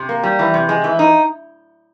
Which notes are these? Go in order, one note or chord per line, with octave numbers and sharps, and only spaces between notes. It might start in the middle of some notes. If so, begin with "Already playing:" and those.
Already playing: C3
A#3
G3
E3
C3
G#3
E3
D#4